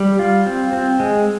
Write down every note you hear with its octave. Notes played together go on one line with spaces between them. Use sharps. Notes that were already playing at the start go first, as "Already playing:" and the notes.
Already playing: G3
F4
C4
C4
G#3